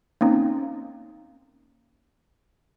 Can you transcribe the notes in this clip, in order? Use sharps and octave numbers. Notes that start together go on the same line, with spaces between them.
A#3 C4 C#4 D#4